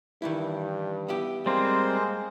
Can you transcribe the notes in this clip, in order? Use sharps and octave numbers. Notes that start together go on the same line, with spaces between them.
G2 D#3 E3 E4
B3 E4 G4
G3 G#3 A#3 C4 C5